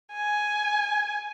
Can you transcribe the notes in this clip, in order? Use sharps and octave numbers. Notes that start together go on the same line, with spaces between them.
G#5